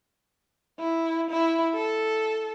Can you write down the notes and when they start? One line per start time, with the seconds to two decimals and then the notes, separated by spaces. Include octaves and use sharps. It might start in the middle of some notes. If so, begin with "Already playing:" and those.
0.79 E4
1.31 E4
1.74 A4